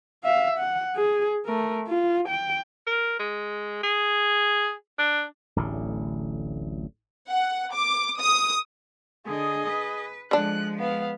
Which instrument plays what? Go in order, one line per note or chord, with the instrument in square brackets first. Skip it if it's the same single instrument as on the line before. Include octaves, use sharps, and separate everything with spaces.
[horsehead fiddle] E5 F5
F#5
G#4
A3 A#4
F4
G5
[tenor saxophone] A#4
G#3
G#4
D4
[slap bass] D1 A1 D3
[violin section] F#5
D6
D#6
[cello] D3 [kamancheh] G#4 D#5
[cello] B4
[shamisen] D3 D4 [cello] F3 G#3 [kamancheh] F#6
[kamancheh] B3 F5